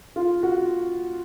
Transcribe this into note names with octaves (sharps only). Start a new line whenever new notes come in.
F4
F#4